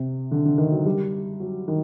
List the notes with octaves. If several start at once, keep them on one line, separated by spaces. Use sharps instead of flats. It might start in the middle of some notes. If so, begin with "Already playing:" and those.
Already playing: C3
D3
D3
D#3
F#3
G3
F#3
D#3